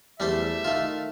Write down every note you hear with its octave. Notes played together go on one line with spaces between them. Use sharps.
E2 G3 A3 C5 E5
D#3 A3 F4